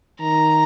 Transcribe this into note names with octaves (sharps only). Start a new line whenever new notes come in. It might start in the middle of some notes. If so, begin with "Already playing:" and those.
D#3 A#5